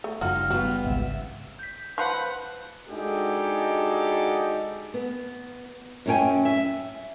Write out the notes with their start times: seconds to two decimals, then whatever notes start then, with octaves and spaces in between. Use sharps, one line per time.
0.04 A3
0.21 F#1 G3 D#4 F4 F#4 F6
0.50 G3 B3 F4 F#4
0.85 G#1 C#2 E5
1.59 G6 B6
1.98 F3 F4 B4 F#5 F#6 G6 F#7
2.87 G#3 D4 D#4 F#4 G4 A4
4.94 B3
6.06 F#2 F#3 C#4 G#4 G5 G#5
6.45 E5